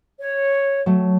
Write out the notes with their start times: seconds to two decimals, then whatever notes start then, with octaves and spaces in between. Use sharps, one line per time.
0.20 C#5
0.86 F#3 A3